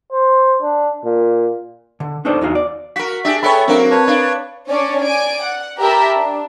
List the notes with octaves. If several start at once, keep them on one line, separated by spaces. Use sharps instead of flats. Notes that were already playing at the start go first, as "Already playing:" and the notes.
C5
D4
A#2
D3
D4 D#4 A4 C5 D5
E2 D#4 F#4 F5
D5
F#4 A#4 B6
D4 G4 G#4 E5
B3 G#4 A4 C#5 E5 G5 B5
F#3 A#3 C4 D4 F#4 A#4
B4 C#5 A5
D4 F5
C#4 D4 C#5 D5
D5 G#5 D7
F#5
G4 A#4 E5 A5 B5
D4